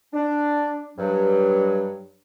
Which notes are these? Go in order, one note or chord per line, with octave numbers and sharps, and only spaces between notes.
D4
G2 F#3